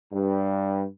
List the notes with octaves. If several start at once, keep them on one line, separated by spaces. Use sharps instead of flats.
G2